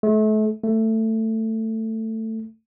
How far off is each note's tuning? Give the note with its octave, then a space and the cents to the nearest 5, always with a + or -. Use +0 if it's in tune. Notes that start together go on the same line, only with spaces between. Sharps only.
A3 -35
A3 +15